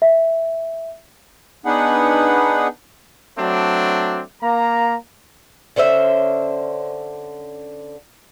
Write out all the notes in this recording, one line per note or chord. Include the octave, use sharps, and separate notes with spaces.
E5
B3 D4 D#4 G#4 B4 F#5
F#3 A3 C4 D4
A#3 A#5
D3 C#4 C5 E5